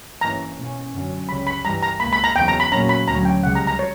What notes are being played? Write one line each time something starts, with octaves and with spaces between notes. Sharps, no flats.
G2 E3 A#3 C#4 A#5
B2 A#3 C#4
F#2 D3 F#3 C#4
C#2 C#3 G3 C#4 B5
B5
G2 E3 G3 A#5
A#5
C#2 B2 A#3 B5
B5
A#5
E2 C#3 F#3 G5
A#5
B5
A#2 F#3 A#3 C#4 A#5
B5
D2 D3 F#3 C#4 A#5
G5
C#2 C#3 G3 F#5
A#5
A#5
C#5